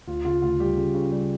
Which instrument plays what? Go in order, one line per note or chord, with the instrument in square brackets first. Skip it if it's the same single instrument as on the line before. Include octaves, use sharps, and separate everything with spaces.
[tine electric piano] D2 [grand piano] F4
[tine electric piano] C#3 [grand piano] F4
[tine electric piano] D2 [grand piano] F4
[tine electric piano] G3 [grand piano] G4
[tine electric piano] C#3
C#3
G3